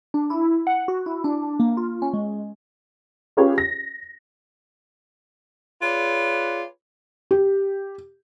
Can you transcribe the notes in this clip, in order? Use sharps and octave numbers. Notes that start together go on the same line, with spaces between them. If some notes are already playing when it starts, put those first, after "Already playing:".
D4
E4
F#5
F#4
E4
D4
A#3
F4
C#4
G#3
C#4 F4 G4 G#4 B4 C#5
A#6
F4 G#4 B4 C#5 D5
G4